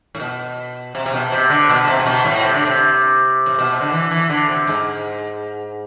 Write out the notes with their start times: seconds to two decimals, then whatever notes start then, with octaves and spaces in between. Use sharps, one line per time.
0.15 A2
0.20 B2
0.95 C3
1.06 C3
1.14 B2
1.32 C3
1.50 D3
1.69 B2
1.87 C3
2.00 C3
2.06 B2
2.25 A2
2.43 C3
2.55 D3
2.65 C3
3.46 A2
3.58 B2
3.70 C3
3.81 D3
3.92 E3
4.11 E3
4.29 D3
4.49 C3
4.67 G#2